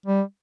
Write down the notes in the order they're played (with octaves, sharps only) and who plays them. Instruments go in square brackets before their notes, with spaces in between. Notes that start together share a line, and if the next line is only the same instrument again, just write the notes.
[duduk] G3